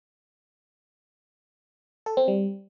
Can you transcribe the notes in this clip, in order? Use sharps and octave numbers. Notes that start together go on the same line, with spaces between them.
A4
C4
G3